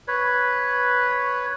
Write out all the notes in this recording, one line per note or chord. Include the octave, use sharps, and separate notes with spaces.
B4 C#5